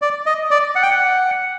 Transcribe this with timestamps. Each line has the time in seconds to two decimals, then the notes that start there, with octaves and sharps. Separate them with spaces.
0.02 D5
0.26 D#5
0.51 D5
0.76 F#5
0.83 G5
0.91 F#5